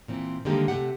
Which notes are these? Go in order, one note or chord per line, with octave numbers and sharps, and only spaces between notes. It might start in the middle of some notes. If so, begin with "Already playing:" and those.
A#2 E3 C4
D3 D#3 G3 G#3 A#3 G4
C3 F3 A3 G4 F#5